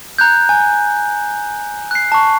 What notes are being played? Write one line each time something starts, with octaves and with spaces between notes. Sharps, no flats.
A#5 F#6 G6
G#5
F#6 C7
A5 C#6